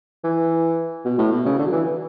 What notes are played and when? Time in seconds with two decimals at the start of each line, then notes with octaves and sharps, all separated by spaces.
0.24 E3
1.05 B2
1.18 A2
1.32 B2
1.46 C#3
1.59 D3
1.67 F#3
1.72 E3